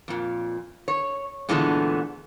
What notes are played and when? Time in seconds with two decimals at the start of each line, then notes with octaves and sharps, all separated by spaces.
0.08 F2 A#2
0.88 C#5
1.49 A#2 D3 E3 G#3 A3 B3